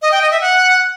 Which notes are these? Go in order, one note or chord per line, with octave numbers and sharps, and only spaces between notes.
D#5
G5
D#5
E5
F#5